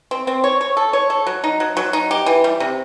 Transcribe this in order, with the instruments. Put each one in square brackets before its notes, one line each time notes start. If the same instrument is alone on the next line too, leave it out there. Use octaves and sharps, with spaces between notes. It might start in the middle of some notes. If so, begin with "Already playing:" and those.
[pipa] C4
C4
C#5
C#5
A4
C#5
A4
F#3
D#4
F#3
F#3
D#4
G4
E3
G3
C3